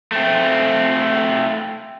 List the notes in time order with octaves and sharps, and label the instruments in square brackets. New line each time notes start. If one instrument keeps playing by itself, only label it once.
[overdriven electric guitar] A3 C4